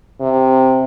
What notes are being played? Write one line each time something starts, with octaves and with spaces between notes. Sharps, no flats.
C3